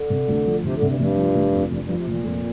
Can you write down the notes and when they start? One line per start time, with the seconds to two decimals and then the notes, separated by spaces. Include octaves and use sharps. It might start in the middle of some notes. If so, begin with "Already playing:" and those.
Already playing: D3
0.10 C3
0.28 D2
0.46 F3
0.64 D2 C3
0.76 D3
0.82 C3
0.88 G2
0.99 F1 G2
1.18 F3
1.35 F1
1.53 F2
1.71 F1 G2
1.83 G2
1.89 F3
1.96 C3
2.07 F1 A#2
2.25 F2